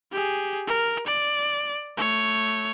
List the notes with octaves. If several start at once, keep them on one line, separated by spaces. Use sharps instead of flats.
G4 G#4
A#4
D5
A3 C#5